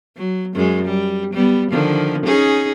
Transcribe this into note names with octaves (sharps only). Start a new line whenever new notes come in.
F#3
F#2 G#3
G3
G3 B3
D3 D#3 F3
C#4 D#4 G#4